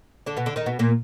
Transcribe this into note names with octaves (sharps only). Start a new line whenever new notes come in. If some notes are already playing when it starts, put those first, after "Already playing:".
D3 D4
B2 B3
D3 D4
D#3 D#4
B2 B3
A#2 A#3